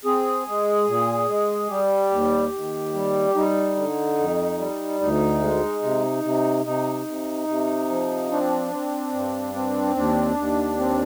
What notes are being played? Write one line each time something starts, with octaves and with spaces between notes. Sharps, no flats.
C4 G#4
G#3
A#2
G#3
G3 G4
D#2
D#2
G3
G3 D#4
D3
F2
G3
D2 D#4
G#3
C3
C3
C3 D#4
C3
C3
F3
C4 D4
C4
G2
C4
D#2 D4
D#2
C4